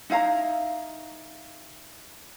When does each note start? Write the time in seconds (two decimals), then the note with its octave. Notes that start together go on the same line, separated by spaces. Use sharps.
0.10 D#4 E4 F5 A#5